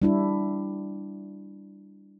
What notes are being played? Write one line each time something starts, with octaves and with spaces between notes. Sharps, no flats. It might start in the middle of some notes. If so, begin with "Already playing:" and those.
G3 D4 E4